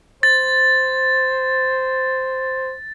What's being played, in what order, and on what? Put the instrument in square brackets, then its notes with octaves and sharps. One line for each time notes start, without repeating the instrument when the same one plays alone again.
[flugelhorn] C5 [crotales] A6